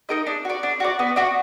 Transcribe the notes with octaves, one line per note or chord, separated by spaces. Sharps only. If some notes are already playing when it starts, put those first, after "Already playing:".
D#4 A#4 D#5
D4
F#4 D5
D4
F#4 D5
B3
D4 F#4